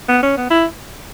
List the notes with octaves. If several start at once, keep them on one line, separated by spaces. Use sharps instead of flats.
B3
C#4
B3
E4